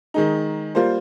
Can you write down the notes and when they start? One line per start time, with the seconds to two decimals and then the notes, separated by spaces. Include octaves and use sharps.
0.14 D#3 G#3 D#4
0.75 G3 A#3 F4 C5